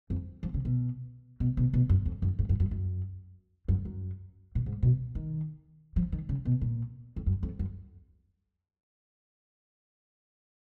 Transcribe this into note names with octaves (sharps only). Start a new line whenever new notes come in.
F2
F3
C#3
B2
B2
B2
B2
F#2
F2
F#2
G#2
F#2
F#2
F#2
F#2
F#2
A#2
G#2
B2
D#3
F3
D#3
C#3
B2
A#2
F2
F#2
F2
F#2